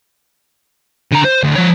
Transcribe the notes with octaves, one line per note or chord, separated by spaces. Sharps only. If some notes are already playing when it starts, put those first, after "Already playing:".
D3 A#5
C5
D2
F3 C#5